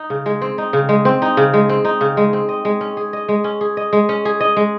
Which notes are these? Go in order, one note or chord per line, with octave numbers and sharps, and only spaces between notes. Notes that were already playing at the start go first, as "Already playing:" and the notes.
Already playing: D#4
C#3
G#3
C4
D#4
C#3
G#3
C4
D#4
C#3
G#3
C4
D#4
C#3
G#3
C4
D#5
G#3
C#4
G#4
D#5
G#3
C#4
G#4
D#5
G#3
C#4
G#4
D#5
G#3